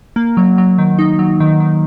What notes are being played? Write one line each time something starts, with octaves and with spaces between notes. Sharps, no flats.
A#3
F#3
F#3
D#3
D#4
F#3
D#3
D#3